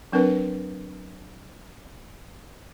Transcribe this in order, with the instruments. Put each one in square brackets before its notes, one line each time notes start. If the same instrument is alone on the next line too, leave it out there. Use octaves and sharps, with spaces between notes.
[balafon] F#3 C4 D4 A#4 B4